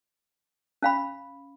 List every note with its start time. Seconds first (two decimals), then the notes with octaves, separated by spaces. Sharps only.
0.82 C#4 F5 B5